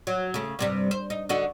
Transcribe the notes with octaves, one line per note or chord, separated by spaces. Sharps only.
F#3
C#3 A3
G2 C3 G3
C5
D#4
D3 D#4 F#4